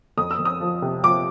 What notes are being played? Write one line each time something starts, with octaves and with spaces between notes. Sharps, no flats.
F2 D#6
E6
F2
D#6
F3
C3
F3 D6